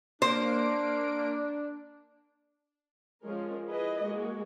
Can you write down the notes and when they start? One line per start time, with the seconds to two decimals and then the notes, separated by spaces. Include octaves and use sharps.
0.22 A#3 D4 C5 D7
3.23 F3 G#3 C#4 A#4
3.67 E4 G#4 B4 D#5
4.03 G#3 A#3 F#4